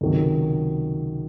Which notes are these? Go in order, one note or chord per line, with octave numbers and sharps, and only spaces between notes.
C#2 C3 D#3 F#3